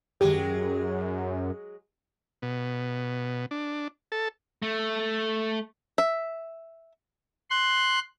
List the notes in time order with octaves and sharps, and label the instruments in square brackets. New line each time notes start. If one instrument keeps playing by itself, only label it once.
[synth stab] G#1 G4 [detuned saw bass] F#2 [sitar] F#3 G#3 G#4
[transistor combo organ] B2
D4
A4
[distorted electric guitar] A3
[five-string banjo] E5
[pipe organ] C6 F#6